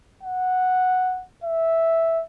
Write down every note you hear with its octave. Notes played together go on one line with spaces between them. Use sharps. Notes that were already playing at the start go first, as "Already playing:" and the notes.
F#5
E5